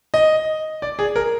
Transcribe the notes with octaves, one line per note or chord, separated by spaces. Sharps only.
D#5
D5
G#4
A#4